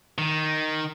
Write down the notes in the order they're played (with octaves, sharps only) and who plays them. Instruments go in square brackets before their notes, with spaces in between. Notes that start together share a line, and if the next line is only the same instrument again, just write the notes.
[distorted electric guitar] D#3